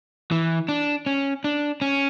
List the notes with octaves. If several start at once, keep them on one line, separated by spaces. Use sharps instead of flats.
E3
D4
C#4
D4
C#4